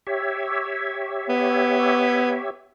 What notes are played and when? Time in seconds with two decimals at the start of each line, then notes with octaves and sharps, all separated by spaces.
0.07 G4 C#5 E5
1.29 B3